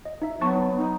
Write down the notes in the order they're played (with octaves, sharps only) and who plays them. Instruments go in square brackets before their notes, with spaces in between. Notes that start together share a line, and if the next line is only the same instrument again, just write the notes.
[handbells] D#5
D#4 E5
[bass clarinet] F#3 [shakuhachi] B3 [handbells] A5 C#6 A6
[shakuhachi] D#4